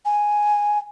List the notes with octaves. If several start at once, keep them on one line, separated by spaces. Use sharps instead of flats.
G#5